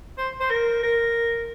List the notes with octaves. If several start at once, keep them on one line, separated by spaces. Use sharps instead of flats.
C5
C5
A#4
A#4